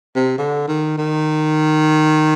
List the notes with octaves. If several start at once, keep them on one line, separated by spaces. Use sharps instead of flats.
C3
D3
D#3
D#3